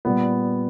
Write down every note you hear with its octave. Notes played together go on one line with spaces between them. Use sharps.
A#2 G3 B3